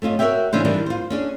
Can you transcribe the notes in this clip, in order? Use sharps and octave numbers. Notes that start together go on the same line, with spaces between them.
A3 C#4 F4 D#5
F#4 A#4 B4 C#5 E5 G5
C#3 E3 C#4 D4 C5
D#3 E3 G3 D4
F4 C5
C#4 D4 G#4